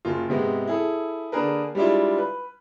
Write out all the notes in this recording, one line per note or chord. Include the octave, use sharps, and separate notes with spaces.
F#1 F4
G#2 C3 G#3 B3
E4 G#4 A4
D3 A#3 D4 G#4 A#4 B4
G3 G#3 D4 E4 F4
B4